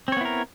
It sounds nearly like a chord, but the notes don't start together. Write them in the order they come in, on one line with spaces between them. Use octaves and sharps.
C4 C#5 B3 E4 A#4